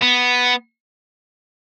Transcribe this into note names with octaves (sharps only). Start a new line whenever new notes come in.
B3